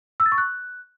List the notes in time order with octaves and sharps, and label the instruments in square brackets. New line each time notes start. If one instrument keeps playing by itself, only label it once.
[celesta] E6
A6
C#6
F#6